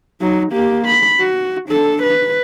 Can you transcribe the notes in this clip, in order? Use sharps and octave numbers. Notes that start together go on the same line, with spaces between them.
F#3 D#4
A#3 G4
B5
F#4
D4 A4
B4